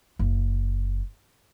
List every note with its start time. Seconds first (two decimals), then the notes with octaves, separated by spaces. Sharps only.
0.19 F#1